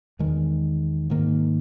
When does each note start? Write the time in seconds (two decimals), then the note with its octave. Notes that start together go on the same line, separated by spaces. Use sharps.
0.19 E2 D#3 G#3
1.10 G#2 D#3 A#3